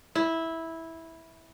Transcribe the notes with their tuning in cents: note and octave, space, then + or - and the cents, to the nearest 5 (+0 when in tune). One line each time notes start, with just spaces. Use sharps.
E4 -10